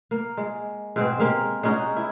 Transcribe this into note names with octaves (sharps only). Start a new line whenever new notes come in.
A#3
G#3
G#2 B2 G#3 C4
G#3 A#3 G4
G#3 C#4 D#4 F#4
E4